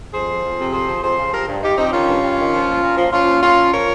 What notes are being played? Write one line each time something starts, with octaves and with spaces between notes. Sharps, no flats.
F2 G#4 C5
F3
F2
C3
F2 G#4 C5
F3
F2 G#4 C5
C#3
F3 G4 A#4
G2
G2 D#4 G4
F3 C4 D#4
G4
D#3 C#4 F4
G2
G2
D#3
F3
A#2
A#2
F3
F3 C#4 F4
A#2
A#2 C#4 F4
F3
F3 A#4 C#5